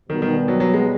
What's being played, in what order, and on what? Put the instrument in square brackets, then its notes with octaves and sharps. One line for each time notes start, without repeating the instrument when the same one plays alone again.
[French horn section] B2 G3 B3 [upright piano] D#3
[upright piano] D#3
F#3
F#3
G#3